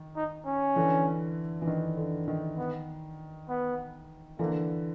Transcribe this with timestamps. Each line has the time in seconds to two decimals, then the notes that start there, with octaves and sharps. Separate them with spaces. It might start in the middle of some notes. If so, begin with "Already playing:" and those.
Already playing: D#3
0.16 D#4
0.46 C#4
0.76 D3 E3
1.62 E3
1.67 D#3
1.97 D3
2.28 D#3
2.57 B3
3.49 B3
4.39 D3 E3 A#3